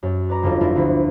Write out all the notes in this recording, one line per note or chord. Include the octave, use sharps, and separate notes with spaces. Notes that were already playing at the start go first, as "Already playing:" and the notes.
F#2
B4 D5 A#5
G1 F2 F4 A4 A#4
A3 C4 E4 F4 A4 A#4
D2 B3 B6